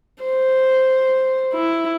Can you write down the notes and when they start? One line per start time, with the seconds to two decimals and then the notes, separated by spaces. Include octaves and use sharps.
0.23 C5
1.54 E4